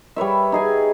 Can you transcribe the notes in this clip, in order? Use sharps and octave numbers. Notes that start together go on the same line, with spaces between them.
G3 B4 C#5 E5
D#4 G#4 G#5